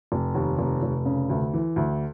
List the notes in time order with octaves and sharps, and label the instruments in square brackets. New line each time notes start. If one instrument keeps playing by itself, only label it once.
[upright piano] F1
D#2
F1
F1
C#3
D2
E3
D2